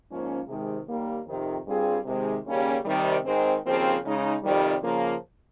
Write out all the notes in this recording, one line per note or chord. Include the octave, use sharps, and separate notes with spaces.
G#2 F3 A#3 C#4
C3 D#3 G#3
D#2 D#3 G3 A#3
F2 C3 D#3
G2 G3 C4 F4 G#4
C3 D#3 G#3
D#2 C#3 G3 A#3 C#4
C3 D#3 G3
G#2 D#3 G#3 C4
D#2 C#3 F3 C4
C#3 G#3 D#4
F2 C3 D#3 G3
C#3 F3 A#3